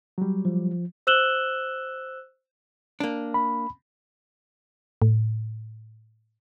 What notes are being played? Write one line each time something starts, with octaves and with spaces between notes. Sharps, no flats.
F#3 G3
F3
C5 E6 F#6 E7 F#7 G7
A#3 D4
B5
A2